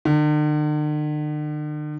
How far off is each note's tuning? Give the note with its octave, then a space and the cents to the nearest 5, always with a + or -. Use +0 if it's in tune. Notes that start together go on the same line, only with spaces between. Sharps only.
D3 +45